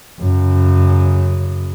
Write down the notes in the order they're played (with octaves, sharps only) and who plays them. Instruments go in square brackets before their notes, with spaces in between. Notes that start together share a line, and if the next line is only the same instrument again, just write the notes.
[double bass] F#2 C#3